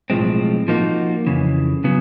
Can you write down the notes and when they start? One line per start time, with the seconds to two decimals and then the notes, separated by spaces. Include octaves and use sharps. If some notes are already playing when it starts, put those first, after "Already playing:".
0.10 B1 A2 F3 G#3 C4
0.68 F3 A#3 D#4 F#4
1.27 F2 C#3 E3
1.84 C#3 F#3 B3